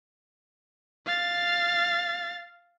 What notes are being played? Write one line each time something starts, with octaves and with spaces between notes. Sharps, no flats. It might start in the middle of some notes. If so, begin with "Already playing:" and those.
F5 A6